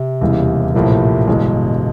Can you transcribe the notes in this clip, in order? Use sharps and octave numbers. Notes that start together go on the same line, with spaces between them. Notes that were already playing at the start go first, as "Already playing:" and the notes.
Already playing: C3
E1 D#2 C#3 E3 G3
A#1 A2 C3 F3 A#3
G1 G2 B2 E3 G#3